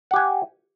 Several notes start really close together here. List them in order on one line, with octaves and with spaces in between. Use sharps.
F#5 G4 G#5